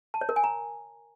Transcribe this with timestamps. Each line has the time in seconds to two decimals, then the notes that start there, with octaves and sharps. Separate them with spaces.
0.14 A5
0.21 C#5
0.29 A#4
0.36 G#5
0.44 A#5